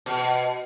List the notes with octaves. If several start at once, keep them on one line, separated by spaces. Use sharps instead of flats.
B2